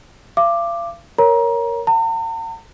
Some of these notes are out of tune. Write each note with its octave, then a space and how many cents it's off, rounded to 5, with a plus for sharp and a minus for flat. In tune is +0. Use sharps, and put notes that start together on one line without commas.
F5 -40 D6 +10
A#4 +0 C#5 +0 A#5 +25
F#5 +0 A#5 -45